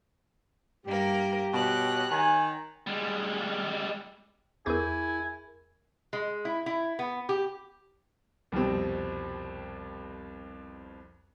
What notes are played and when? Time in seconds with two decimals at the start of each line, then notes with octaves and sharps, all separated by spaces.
0.86 G2 A#3 G4 A#4
1.54 B2 C#5 F#6
2.11 D#3 G#5
2.87 G3 G#3
4.66 E2 E4 G#4 A#4 G#5 C#6 G6
6.13 G#3
6.45 E4
6.66 E4
6.99 B3
7.29 G4
8.52 C2 F2 B2 G3 C4